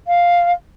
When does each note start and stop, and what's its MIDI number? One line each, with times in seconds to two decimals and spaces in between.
0.07 0.51 77